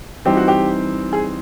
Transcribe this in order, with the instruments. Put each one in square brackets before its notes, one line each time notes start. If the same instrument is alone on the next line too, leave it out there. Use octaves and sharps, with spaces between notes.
[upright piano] E3 G3 C4 D#4 [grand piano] G4
[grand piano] F#4
G4
G#4